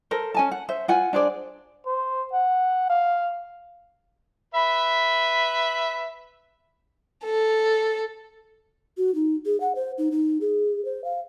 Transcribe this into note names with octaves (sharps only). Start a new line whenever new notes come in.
A4 A#4 C5
C#4 G#5 A5
F#5
C5 E5
F4 F#5 G#5
D4 G#4 C5 D5
C5
F#5
F5
B4 E5 B5
A4
F#4
D#4
G#4
F#5
C5
D#4
D#4
G#4
C5
F5